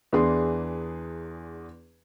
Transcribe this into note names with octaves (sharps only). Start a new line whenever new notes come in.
E2 E3 D4 G#4 C6